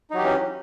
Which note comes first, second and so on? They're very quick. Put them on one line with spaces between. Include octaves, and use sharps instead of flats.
D#4 F#3 G4 E3 C#4